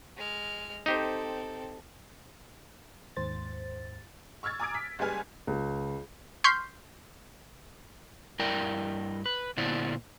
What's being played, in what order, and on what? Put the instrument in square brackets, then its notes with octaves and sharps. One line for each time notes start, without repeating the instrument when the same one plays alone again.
[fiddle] G#3 F6
[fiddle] C4 A4 [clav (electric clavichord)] D#4 G4 C5
[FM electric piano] D#2 G#2 C5 A6
[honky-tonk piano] C#6 E6 F6 G#6 A6
G#5 A#5 D6 D#6 G#6 D7
B6
F#1 G3 G#3 B4 G#5 F6
[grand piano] C#2
[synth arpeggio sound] C6 C#6 F6 G6 B6 C7
[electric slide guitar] G2 E4 A#4 D5 G5
B4
A#2 D3 B3 E4 C5 D5